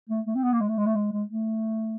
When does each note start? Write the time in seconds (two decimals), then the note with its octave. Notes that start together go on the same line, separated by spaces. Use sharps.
0.10 A3
0.27 A3
0.35 C4
0.44 B3
0.52 A#3
0.60 G#3
0.69 A3
0.77 G#3
0.86 A3
0.95 G#3
1.12 G#3
1.29 A3